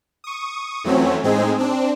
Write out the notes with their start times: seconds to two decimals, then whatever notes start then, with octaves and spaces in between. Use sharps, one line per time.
0.24 C#6 D#6
0.84 F2 E3 F#3 A3 C4 C#4
1.23 A2 G#3 C4 D#4 G#4
1.59 C4 D4